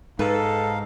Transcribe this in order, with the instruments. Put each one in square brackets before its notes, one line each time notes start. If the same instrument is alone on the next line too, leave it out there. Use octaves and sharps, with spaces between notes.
[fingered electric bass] G#2 [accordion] D#4 F5 [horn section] A4 [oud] B4